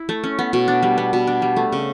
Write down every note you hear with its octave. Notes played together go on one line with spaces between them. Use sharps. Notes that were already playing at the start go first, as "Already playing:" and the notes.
Already playing: E4
A3
C#4
B3
B2
D4
G3
B3
B2
D4
G3
A3
C#3